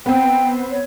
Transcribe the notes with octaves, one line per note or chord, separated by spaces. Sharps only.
B3 C4 G5
C#5